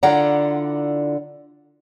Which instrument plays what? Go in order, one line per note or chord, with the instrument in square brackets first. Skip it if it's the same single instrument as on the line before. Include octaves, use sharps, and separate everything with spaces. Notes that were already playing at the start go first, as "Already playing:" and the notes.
[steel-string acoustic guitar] D3 E4 F4 D5 F#5 A#5